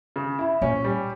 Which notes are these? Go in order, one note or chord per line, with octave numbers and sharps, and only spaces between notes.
C#3
E4
A#2 C#4
G3